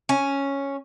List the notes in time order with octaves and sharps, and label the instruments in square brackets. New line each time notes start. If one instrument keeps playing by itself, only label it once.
[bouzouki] C#4